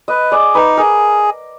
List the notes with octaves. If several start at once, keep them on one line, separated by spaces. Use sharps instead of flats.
B4 D#5
G#4 D5
D#4 B4
G#4 A#4